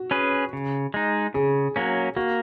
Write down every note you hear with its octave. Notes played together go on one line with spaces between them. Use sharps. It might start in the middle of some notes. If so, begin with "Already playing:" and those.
Already playing: F#4
C#4 G#4 B4
C#3
G#3 D#4
C#3 G#4
F#3 A#3 C#4
A#3 F#4